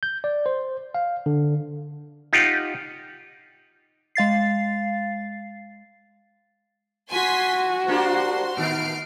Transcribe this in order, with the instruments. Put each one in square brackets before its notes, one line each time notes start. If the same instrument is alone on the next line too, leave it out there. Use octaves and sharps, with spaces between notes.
[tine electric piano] G6
D5
C5
F5
D3
[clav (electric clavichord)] D#4 F4 G4 F#5
[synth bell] G#3 F5 A6 C7
[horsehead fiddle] F#4 [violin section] G#5 C6 B6
[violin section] G#5
[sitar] A#3 D4 G4 [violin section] C5 C6
[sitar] A2 D#3 B3 [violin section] F6 C7 D7